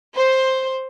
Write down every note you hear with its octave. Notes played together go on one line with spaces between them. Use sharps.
C5